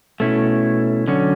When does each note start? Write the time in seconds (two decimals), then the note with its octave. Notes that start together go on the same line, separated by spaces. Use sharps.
0.20 B2 A3 C#4 E4
1.08 D3 F#3 C#4